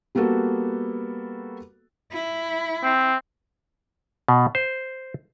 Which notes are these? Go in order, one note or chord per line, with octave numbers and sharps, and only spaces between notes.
G3 A#3 B3 F#4 A4
E4
C4
B2
C5